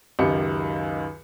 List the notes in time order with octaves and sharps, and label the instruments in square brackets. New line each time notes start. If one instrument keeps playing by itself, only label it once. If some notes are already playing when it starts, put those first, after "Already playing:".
[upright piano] C#2 F#2 D#3 G4 C#7